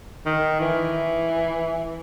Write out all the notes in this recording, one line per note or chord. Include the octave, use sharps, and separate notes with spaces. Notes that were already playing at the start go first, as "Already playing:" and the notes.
D#3
E3